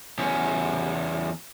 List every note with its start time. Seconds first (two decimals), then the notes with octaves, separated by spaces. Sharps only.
0.18 E2 C#4